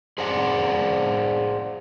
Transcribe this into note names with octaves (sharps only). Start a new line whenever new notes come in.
G#4 C5 D5 F#5